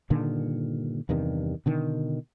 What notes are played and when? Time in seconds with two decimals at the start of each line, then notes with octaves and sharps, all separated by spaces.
0.10 G2 A#2 D3 D#3
1.09 E2 G2 C3 D#3
1.66 B2 D3 D#3